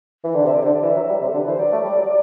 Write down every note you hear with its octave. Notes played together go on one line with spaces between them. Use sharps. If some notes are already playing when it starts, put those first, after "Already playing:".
E3
D3
C3 E5
D5
D3 C5
D5
E3 E5
F#3
G3
C3 G4
D3 A4
B4
E3
C5
F#3 D5
A3
G3
F#3